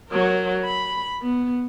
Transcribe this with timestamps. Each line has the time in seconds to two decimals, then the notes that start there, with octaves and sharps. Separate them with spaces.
0.10 F#3 A#4
0.65 B5
1.22 B3